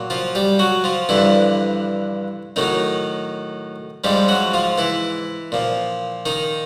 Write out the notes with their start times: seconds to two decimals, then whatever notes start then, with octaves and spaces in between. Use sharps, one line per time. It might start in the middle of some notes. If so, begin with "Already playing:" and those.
Already playing: A#2 F#3
0.10 F3 F4
0.35 G3 G4
0.59 F#3 F#4
0.84 F3 F4
1.09 G2 D3 E3 F3 E4
2.56 A2 D#3 F#3 D#4
4.04 G#2 F3 G3 G4
4.28 F#3 F#4
4.54 F3 F4
4.78 E3 E4
5.52 A#2 F3
6.26 D#3 D#4